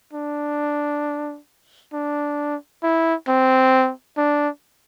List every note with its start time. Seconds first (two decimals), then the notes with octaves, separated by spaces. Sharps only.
0.14 D4
1.93 D4
2.83 E4
3.28 C4
4.17 D4